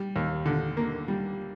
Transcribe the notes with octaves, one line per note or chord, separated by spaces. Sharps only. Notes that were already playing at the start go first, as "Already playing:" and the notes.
Already playing: G3
D#2
D3
A#3
G3